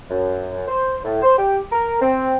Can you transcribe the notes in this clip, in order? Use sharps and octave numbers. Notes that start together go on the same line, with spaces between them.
F#2
C5
A2
C5
G4
A#4
C4